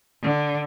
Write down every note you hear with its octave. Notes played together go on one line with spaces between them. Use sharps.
D3